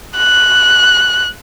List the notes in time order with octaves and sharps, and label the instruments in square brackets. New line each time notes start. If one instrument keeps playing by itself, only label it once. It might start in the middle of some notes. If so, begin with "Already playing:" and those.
[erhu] F#6